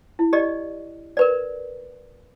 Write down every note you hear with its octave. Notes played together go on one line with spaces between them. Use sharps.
E4
G4 D5 D#5
A#4 B4 D5